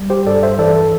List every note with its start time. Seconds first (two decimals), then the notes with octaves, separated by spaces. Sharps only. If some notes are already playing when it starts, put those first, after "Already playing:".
Already playing: G3
0.10 G4 C5
0.26 G2 A4 D5
0.43 C5 E5
0.54 E5
0.59 E3 A4 D5
0.76 A4